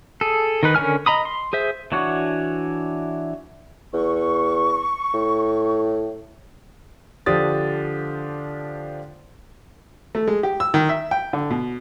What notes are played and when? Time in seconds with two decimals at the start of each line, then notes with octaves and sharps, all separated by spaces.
0.21 G#4 A4
0.63 D#3 D#4 B4
0.75 D3 C#4 A#4 G#5 F6
1.06 D#5 A#5 B5 D#6
1.25 C6
1.53 G#4 C5 E5
1.92 E3 D4 F#4 C#5 F#5
3.93 E2 C#6
5.14 A2
7.26 D3 F3 D4 G4 D#6 A6
10.15 A3
10.28 G#3
10.43 G4
10.60 E6
10.74 D#3
10.89 E5
11.11 G5
11.33 D3
11.50 B2